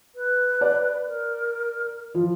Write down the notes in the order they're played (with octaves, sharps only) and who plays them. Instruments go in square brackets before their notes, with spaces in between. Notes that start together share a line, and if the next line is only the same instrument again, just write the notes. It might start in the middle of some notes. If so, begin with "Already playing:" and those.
[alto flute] B4
[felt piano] D5
[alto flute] A#4
[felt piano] F3